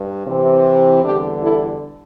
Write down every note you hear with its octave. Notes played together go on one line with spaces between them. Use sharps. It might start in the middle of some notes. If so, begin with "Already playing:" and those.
Already playing: G2
C3 E3 C4
E2 D3 G3 D4 G4
E4 A4